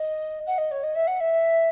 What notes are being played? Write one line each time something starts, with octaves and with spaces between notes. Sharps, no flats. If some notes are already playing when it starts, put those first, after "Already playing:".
Already playing: D#5
F#5
D#5
C#5
D#5
E5
F#5
E5